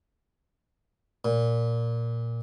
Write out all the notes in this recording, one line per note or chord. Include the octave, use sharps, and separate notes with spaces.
A#2